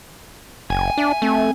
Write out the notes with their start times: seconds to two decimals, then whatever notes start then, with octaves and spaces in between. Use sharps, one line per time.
0.70 F#1 G5 G#5
0.98 D4 E5
1.22 A3 C4